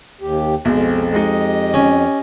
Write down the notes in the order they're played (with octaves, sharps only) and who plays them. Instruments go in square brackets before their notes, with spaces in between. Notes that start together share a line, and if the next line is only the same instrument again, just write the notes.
[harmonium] D#2 G4
[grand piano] B1 [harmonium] F2 [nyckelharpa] G#3
[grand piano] G#3 D#4 [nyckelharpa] G4 D#5
[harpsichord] C#4